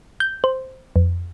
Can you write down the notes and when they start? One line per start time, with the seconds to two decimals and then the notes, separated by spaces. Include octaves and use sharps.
0.20 G6
0.44 C5
0.96 F2